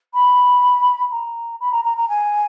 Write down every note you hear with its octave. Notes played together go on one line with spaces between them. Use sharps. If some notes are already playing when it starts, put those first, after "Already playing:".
B5
A#5
B5
A#5
A#5
A#5
G#5